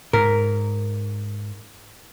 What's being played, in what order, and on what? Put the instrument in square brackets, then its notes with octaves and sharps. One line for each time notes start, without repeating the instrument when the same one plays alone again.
[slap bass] G#2 [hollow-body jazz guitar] A#4